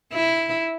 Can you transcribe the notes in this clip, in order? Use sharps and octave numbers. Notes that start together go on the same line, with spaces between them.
E4